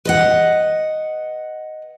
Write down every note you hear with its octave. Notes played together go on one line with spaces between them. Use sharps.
B4 D#5 F#5